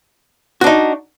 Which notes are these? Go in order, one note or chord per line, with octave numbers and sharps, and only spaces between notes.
D4 D#4 F#4